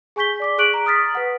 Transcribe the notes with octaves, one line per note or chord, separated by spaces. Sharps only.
G#4 G#5 C#6 G6 B6 G7
D5 D6 B6
G#4 C#6 F#6 D7 F#7
A#5
D#6 F6 A6 B6
B4 F#5